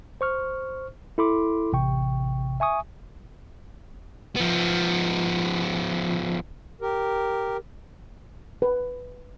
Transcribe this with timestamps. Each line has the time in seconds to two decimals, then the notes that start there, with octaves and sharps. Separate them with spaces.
0.21 C5 C#6 F6
1.18 E4 A4 B5 C6 D6
1.73 A1 C3 G5 C#6
2.60 E5 G#5 C#6 D#6
4.36 F3 B3
6.81 G4 A#4
8.62 B4